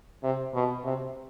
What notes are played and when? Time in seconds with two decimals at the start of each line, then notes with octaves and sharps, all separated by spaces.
0.23 C3
0.54 B2
0.84 C3